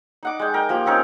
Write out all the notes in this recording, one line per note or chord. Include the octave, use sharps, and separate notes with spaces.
D#4 F#5 D6
G#3 G5
A#4 G5
F3 A#3 G4
C4 C#4 D#4 A#4